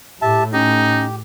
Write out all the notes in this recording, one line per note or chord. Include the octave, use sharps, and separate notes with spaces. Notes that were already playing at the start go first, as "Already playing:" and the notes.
A2 G4 E5 A5
C#4 D#4 G4